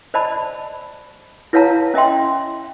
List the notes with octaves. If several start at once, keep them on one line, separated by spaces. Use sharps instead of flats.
C5 D5 D#5 A5 B5
E4 B4 C#5 F5 A5 A#5
C#4 D#5 E5 G5 C6